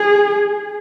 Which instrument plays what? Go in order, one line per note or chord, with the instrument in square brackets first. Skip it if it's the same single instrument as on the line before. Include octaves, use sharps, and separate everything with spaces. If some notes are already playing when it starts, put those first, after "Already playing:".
Already playing: [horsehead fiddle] G#4